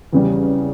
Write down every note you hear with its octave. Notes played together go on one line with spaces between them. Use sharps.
E2 C#3 G3